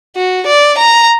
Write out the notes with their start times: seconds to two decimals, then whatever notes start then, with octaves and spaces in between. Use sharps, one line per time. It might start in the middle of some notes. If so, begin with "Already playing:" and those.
0.16 F#4
0.47 D5
0.78 A#5